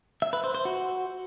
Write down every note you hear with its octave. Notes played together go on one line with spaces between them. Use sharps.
E5
B4
C5
C5
F#4